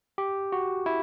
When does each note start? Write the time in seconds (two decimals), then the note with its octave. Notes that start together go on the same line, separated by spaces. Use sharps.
0.18 G4
0.52 F#4
0.86 E4